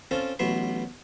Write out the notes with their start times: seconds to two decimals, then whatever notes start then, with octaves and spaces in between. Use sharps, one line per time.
0.11 C4 C#4 F4 A4
0.39 A1 B2 F#3 E5 C6